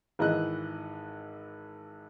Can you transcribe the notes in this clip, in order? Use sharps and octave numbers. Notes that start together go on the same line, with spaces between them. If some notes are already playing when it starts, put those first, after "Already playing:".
G#1 E3 D#5 F#6